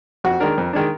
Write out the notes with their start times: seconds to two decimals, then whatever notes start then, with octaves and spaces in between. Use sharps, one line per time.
0.24 F2 F#4
0.40 D#3 G#3 D4 A#4
0.58 F2
0.73 D#3 G#3 D4